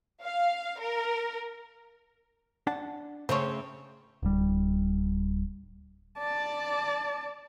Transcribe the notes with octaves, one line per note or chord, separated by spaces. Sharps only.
F5
A#4
D4 F#5 A5
C#3 A3 C4 C5 C#5
D1 G3
D5 A5